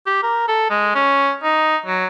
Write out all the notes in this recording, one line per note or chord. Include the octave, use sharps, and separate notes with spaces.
G4
A#4
A4
G#3
C#4
D#4
F#3